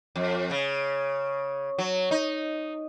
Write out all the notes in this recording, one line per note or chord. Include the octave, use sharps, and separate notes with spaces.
F2
C#3
F#3
D#4